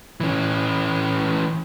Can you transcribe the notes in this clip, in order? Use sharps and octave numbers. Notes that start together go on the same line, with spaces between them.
E3 C#4